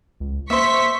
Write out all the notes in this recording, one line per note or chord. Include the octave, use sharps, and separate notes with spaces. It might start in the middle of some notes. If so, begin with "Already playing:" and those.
C#2
A#3 C5 E5 C#6 B6